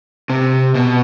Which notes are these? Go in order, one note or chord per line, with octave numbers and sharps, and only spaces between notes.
C3
B2